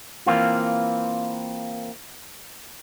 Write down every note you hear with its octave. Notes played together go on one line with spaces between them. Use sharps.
E3 A#3 C4 F4